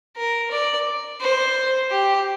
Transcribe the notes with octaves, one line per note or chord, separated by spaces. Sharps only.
A#4
D5
C5
G4